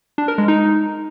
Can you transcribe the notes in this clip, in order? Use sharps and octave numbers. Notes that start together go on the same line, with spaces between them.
D4
A#4
G#3
D#4